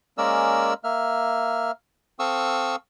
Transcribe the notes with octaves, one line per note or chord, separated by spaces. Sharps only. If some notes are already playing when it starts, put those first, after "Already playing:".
G#3 A#3 C#4 A#4 D5 E6
A#3 E5 F6
C4 A4 F5 C#6 D#6 E6